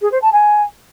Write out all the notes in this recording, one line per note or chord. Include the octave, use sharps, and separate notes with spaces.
G#4
C5
A5
G#5